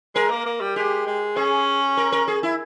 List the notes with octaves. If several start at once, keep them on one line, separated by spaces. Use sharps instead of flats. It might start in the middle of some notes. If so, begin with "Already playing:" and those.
G#3 A#4
A#3
A#3
G3
G#3 G4
G#3
C#4 G#4
A#4
A#4
G#4
E4